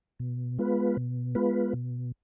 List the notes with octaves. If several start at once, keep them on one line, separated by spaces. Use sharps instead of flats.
B2
G#3 B3 F4 B4
B2
G#3 B3 F4 B4
B2